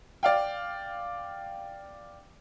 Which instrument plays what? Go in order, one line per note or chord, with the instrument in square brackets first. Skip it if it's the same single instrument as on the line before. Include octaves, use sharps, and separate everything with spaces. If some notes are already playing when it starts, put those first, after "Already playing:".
[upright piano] D5 F5 G5